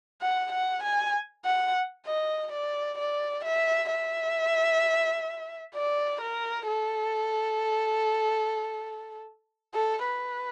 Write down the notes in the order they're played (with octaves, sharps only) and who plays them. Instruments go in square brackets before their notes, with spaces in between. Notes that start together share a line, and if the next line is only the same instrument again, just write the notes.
[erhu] F#5
F#5
G#5
F#5
D#5
D5
D5
E5
E5
D5
A#4
A4
A4
B4